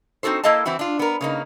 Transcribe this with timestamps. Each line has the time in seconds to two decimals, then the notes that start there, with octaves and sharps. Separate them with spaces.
0.23 C4 D#4 F#4 A4 C5
0.43 A#3 E4 A4 D#5 F5 A5
0.65 E3 C4 E4 F#4
0.79 D4 F4
0.99 B3 A#4
1.21 C#3 A#3 D#4